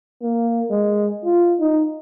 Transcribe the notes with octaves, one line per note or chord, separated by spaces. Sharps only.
A#3
G#3
F4
D#4